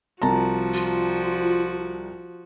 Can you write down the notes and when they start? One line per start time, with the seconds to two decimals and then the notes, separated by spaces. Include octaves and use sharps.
0.22 C2 F3 F#4 A5 A#5
0.74 F4